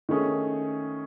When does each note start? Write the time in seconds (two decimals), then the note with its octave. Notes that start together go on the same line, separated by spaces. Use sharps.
0.09 D#3 A3 C#4 G#4